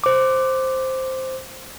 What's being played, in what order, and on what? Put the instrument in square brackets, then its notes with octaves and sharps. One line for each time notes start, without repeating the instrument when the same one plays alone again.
[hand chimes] C5 D6